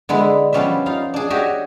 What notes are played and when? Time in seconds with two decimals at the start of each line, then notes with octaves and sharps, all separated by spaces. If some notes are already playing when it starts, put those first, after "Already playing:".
0.09 D3 G#3 B3 E4
0.53 F3 G3 B3 C#4 D4 E5
0.86 D#4 F4 F5
1.14 D4 G#4
1.30 F#4 G4 C#5 D#5 E5